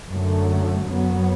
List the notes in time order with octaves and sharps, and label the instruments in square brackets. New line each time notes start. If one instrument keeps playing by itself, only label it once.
[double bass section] F#2 D3 F#3 A3
F#2 F#3 B3